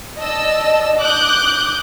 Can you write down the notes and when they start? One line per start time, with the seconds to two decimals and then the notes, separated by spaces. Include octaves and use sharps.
0.18 D5 D#5 A5 E6
0.99 D6 D#6 F#6 G6